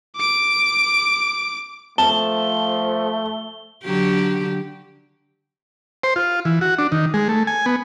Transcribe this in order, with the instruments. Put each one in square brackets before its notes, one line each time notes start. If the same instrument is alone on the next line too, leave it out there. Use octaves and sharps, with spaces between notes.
[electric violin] D6 D7
[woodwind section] F3 [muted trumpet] A3 [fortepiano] A5 [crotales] G7
[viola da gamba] D3 F#3 G4
[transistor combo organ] C5
F4
E3
F#4
D4
D#3
G#3
A3
G#5
B3